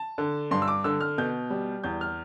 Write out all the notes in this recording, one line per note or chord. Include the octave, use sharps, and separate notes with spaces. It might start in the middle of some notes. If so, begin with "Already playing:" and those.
Already playing: A5
D3
G2 C6
E6
D6
D3 E6
F6
B2 G6
G3
E2 G6
F6